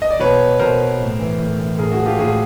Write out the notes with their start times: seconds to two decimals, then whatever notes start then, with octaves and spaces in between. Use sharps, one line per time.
0.02 D#5
0.10 D5
0.20 B2 B4 C#5
0.59 B2 A#4 C5
1.00 A2
1.19 E3
1.39 A2
1.59 E3
1.78 A2 G#4 A#4
1.92 F#4 G#4
1.98 F3
2.06 F4 G4
2.19 A2 F#4 G#4